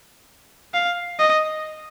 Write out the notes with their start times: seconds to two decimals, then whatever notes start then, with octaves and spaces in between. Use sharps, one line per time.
0.74 F5
1.19 D#5